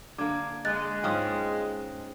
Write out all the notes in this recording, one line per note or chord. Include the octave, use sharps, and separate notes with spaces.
D3 A#3 D6 G#6
G#3 D#5 F#6 A6
G#2 C#4 F4 G5 D#6